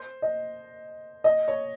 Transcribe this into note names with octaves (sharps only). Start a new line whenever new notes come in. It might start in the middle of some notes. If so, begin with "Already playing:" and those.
Already playing: C5
D#5
D#5
C#5